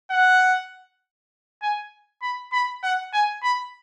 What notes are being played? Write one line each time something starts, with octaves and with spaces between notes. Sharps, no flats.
F#5
G#5
B5
B5
F#5
G#5
B5